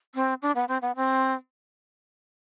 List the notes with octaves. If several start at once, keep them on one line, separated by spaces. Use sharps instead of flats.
C4
D4
B3
C4
B3
C4